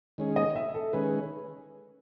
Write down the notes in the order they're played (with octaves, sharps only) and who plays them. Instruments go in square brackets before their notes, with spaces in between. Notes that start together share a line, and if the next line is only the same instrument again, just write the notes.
[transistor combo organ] D#3 G#3 C#4 G#4
[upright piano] D#5
E5
A4
[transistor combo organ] D#3 G#3 C#4 G#4 [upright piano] B4